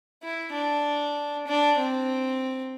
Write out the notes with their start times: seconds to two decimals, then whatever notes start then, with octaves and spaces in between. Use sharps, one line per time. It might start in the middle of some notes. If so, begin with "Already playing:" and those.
0.23 E4
0.53 D4
1.47 D4
1.78 C4